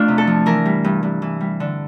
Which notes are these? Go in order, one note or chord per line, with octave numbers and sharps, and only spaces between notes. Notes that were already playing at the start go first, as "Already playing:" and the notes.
Already playing: F2 F3 A3 D4 F4
C3
A4
F3
E3 A#4
G3
G2
G2
E3
G3
D3